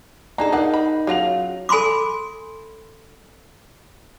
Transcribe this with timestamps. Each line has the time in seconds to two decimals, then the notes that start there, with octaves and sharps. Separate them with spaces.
0.38 D4 D#4 G#4 A4 A#5
0.52 D#4 G#4 A#4 D5 F#5
0.74 B5
1.07 C#3 F#3 F4 F#5 A#6 F7
1.69 A4 G#5 B5 C6 D6